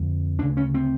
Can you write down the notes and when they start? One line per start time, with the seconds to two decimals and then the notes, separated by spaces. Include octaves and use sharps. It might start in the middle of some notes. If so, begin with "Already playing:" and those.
Already playing: F2 D3
0.39 D2 D4
0.42 C#3
0.57 C#4
0.74 C4